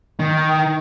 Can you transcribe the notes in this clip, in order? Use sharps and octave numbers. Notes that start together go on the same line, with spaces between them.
D#3